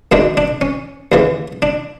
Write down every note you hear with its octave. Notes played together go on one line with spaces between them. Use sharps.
F#2 D#3 G#3 D4
D4
C#4
D#2 C#3 E3
D4